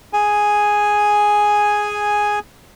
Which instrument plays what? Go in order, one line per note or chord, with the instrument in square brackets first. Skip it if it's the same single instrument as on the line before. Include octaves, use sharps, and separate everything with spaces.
[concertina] G#4 G#5